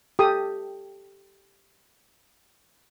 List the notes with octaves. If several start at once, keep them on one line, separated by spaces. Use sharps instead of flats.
G4 A4 D#6